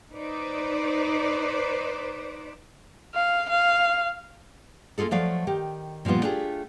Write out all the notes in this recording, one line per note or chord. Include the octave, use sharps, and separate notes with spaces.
D#4 B4 C5 D5
F5
F5
A#3 C4 F4 G#4 A4
F3 F#3 A3 D5 F5
D#3 G4
A#2 F3 G3 B3 F4
A3 D4 F4 G4 G#4